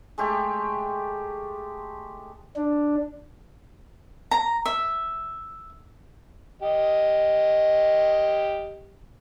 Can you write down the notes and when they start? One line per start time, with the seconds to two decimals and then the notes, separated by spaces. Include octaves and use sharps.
0.18 G#3 A3 G4
2.56 D4
4.31 A#5
4.66 E5
6.62 G4 D#5